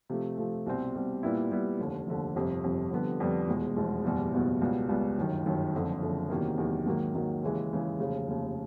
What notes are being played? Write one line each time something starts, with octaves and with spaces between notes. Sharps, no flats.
C3 F3 A3
C3 F3 A3
C2 B2 G3 C4
C2 B2 G3 C4
A#2 G3 B3 E4
A#2 G3 B3 E4
F1 D#2 D3
F1 D#2 D3
G1 F2 C3
G1 F2 C3
F2 D3 G3 B3
F2 D3 G3 B3
F1 E2 B2 G#3
F1 E2 B2 G#3
F#1 E2 B2 G3
F#1 E2 B2 G3
C#2 B2 G3 B3
C#2 B2 G3 B3
G1 F#2 D#3
G1 F#2 D#3
F#1 F2 D3
F#1 F2 D3
E2 C3 D#3 F#3 A#3
E2 C3 D#3 F#3 A#3
G#2 D#3 F#3 A#3
G#2 D#3 F#3 A#3
D#2 C#3 E3 G#3
D#2 C#3 E3 G#3
F1 D#2 C#3
F1 D#2 C#3